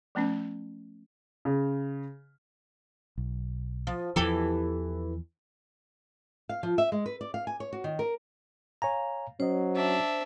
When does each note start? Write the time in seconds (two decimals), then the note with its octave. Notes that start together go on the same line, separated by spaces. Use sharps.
0.15 F3 A3 B3 C#4
1.45 C#3
3.18 B1
3.87 F3
4.16 E2 E3 F3 G4 A4
6.49 F5
6.63 F3
6.78 E5
6.92 G#3
7.06 B4
7.21 D5
7.34 F5
7.47 G#5
7.60 C#5
7.73 F#4
7.84 D#3
7.99 A#4
8.82 C#5 F5 G#5 A#5
9.40 F#3 C#4 C5 D#5
9.75 D4 E5